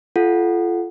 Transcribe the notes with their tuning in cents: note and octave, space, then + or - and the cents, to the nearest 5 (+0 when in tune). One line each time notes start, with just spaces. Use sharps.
F4 -20 A4 -25 F#5 +0